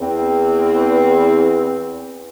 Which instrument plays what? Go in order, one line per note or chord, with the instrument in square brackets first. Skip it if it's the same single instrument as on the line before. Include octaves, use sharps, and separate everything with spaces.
[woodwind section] E2 C4